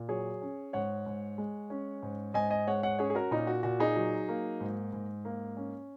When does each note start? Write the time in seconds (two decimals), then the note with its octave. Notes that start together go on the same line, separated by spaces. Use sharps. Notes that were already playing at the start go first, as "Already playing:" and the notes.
Already playing: A#2
0.09 F#3 G#4 C#5
0.42 C#4
0.73 G#2 C#5 F#5
1.06 G#2
1.38 G#3
1.70 C#4
2.03 G#2
2.34 G#2 D#5 G#5
2.50 D#5 G#5
2.67 G#3 C#5 F#5
2.83 C#5 F#5
2.99 C#4 G#4 C#5
3.10 G#4
3.15 F#4 A#4
3.31 A#2 D#4
3.47 F#4
3.63 A#2 F#4
3.80 D#4 G#4
3.96 F#3
4.29 A#3
4.60 G#2
4.93 G#2
5.25 A#3
5.57 C#4